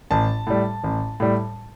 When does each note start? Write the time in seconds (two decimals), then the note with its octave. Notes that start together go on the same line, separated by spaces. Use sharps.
0.11 A1 A5
0.47 A2 G3
0.84 A1
1.20 A2 G3